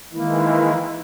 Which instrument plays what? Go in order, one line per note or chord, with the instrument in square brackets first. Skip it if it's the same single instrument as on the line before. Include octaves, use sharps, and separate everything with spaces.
[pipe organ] D#3 E3 G#3 [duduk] A#3 [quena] E4